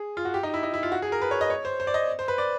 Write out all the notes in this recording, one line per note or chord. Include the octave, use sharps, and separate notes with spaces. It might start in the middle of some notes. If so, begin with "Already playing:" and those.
Already playing: G#4
F4
F#4
G4
D#4
E4
D#4
E4
F4
F#4
G#4
A#4
B4
C#5
D#5
C#5
C5
C5
D5
D#5
C5
B4
D5